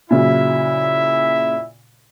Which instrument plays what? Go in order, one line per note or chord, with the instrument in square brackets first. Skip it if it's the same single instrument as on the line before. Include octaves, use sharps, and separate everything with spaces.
[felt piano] A#2 C#3 F#3 [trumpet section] E4 E5